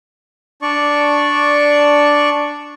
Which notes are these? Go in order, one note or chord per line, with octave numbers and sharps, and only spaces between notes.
D4 D5 C#6